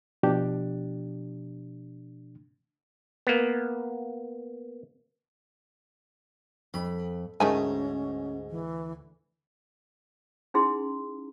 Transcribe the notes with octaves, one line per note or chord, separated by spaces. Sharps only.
B2 F3 D4 G4
A#3 B3
F2 B5
D2 G#2 D#3 A3 C#4 G#5
E3
C#4 D#4 E4 G#4 A#5 C6